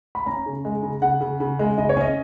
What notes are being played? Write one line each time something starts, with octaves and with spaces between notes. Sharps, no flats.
B5
C#4 A#5
C#3
G#3
C#3
C#3 F#5
C#3
C#3
G#3
C#3 D#5
C#5
C#4 D#5